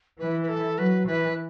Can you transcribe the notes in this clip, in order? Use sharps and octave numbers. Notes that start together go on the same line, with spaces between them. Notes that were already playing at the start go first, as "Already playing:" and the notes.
E3 B4
B4
A4
F#3 B4
E3 B4